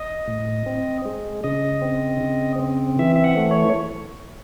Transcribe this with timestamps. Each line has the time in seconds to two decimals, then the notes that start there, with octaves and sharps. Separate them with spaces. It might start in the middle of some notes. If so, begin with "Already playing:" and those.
Already playing: D#5
0.27 A2
0.66 C4
1.05 G#3
1.44 C#3 D#5
1.82 C4
2.21 C#3
2.59 C4
2.99 E3 E5
3.16 E5
3.24 F#5
3.37 A3
3.51 C#5